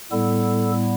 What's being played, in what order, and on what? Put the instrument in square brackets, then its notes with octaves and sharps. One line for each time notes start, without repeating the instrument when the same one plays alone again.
[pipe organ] A2 G3 B3 E4 A4